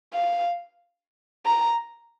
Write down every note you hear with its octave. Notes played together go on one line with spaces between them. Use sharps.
F5
A#5